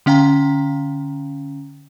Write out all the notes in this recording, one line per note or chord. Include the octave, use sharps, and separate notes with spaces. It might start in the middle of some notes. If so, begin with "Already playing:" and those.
D3 C#4 F5 G5 A#5